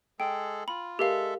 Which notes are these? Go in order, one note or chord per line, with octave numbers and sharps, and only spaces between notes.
G#3 G#4 A4 G5
F4 B5
G#3 G4 A4 A#4 E5 F5